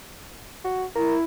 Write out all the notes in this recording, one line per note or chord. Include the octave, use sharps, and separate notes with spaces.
F#4
E4 A#4